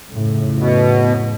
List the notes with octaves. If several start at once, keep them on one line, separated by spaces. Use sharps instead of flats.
F2 A2 C#3
B2